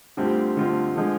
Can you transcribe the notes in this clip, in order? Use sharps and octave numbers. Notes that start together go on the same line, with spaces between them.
D2 D3 G3 C4 F4
D2 D3 G3 C4 F4
D3 F3 G#3